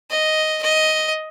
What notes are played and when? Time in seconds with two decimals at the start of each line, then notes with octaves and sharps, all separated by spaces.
0.11 D#5
0.63 D#5